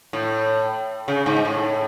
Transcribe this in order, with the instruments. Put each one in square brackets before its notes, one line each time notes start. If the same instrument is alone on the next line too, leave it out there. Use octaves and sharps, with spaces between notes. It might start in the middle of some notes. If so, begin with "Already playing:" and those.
[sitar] A2
C#3
G#2
A2